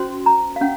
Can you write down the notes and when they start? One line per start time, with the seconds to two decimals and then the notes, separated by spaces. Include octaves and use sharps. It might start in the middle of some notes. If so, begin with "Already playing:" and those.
Already playing: C#4 F#4 C5 C6
0.26 A#5
0.56 F5
0.61 C#4 F#5